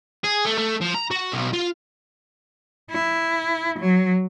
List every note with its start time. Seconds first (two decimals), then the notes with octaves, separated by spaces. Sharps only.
0.24 G#4
0.45 A3
0.58 A3
0.81 F3
0.94 A#5
1.11 F#4
1.32 B1
1.53 F4
2.90 E4
3.79 F#3